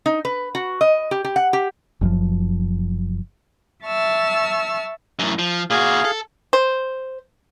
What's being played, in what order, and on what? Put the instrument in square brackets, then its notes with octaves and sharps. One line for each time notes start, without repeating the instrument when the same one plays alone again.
[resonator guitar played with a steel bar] D#4
B4
F#4
D#5
G4
G4
F#5
G4
[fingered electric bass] F#1 F#2 C3 F3
[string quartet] E5 A5 C#6 E6 F6
[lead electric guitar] F#2 A2
F3
[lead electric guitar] A#2 F#4 [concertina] G#4 F5
[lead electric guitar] A4
[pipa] C5